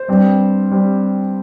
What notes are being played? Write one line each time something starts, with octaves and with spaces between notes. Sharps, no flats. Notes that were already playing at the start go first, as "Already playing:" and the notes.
Already playing: C5
G2 G3 C4
G3 C4